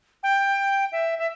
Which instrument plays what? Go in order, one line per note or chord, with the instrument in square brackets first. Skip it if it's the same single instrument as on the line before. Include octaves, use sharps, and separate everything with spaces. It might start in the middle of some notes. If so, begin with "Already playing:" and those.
[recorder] G5
E5
E5